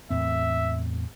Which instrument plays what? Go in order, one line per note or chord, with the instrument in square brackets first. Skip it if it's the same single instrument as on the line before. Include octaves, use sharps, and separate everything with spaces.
[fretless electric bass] E2 A2 C4 [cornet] E5